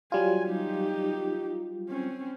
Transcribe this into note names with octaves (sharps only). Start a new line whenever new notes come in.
F#3 G3 F4 G#5
D#4 G4
C4 C#4